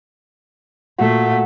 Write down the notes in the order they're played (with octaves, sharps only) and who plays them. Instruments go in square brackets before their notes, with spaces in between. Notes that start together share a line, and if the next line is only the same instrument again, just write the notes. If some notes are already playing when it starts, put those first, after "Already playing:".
[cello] A#2 A3 [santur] F#4